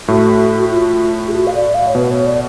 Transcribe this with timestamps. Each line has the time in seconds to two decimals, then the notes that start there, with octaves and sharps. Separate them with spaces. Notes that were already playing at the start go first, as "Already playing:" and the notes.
0.08 A2 A3 F#4
0.71 F4
1.28 G#4
1.33 F#4
1.46 F5
1.54 D5
1.74 F5
1.87 C#5
1.95 B2 B3 B4
2.11 C#5
2.26 D5